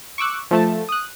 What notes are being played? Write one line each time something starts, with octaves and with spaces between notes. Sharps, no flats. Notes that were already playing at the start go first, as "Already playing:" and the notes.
C#6 D6 E6 F#6
F3 A3 A5
D#6 F#6